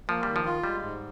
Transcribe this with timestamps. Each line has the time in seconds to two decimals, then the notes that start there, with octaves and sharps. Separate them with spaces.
0.09 F3 A#3
0.23 D#3 G3
0.36 F3
0.45 F4
0.64 G3 G#3
0.82 G#2